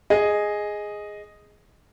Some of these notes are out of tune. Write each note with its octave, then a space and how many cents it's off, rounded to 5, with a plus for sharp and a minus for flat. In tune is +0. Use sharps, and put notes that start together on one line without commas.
G#4 +0 D#5 +0